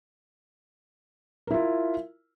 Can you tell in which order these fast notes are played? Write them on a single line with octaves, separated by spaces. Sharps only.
A#4 E4 F4